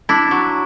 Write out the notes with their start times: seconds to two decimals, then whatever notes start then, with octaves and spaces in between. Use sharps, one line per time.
0.09 D4 E4
0.31 F#3